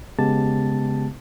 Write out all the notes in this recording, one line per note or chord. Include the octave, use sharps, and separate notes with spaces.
C#3 G#3 B3 G4 A5 A6